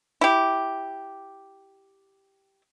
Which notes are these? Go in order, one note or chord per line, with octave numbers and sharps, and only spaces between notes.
E4 G4